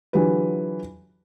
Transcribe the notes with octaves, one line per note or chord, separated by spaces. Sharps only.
D3 E3 F#3 F4 G4 B4